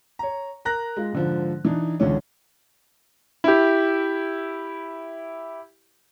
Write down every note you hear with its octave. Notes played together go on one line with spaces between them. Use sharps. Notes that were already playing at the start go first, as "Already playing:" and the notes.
C#5 A#5
A#4 A#5 F#6 A#6
G#3 F4
G#2 D3 F3
E3 D4 D#4
C#2 D3 E3 C#4
E4 G4